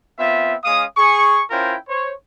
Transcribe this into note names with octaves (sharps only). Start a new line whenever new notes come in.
B3 C4 F4 E5
G#3 C#4 F5 D#6
G#4 C#6
C#4 E4 F4 A#4 C5 G5
C5 C#5